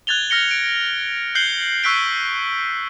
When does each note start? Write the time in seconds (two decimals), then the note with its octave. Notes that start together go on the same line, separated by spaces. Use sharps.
0.07 F#6 G#6 A6 F7 G7
0.30 F6 A#6 C#7 G7
0.51 D7
1.35 F#6 G6 C7 F#7 G7
1.83 C#6 E6 F#6 B6 D7 G7